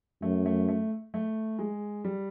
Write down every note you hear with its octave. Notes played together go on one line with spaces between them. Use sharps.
F#2 A3
A3
A3
A3
G#3
G3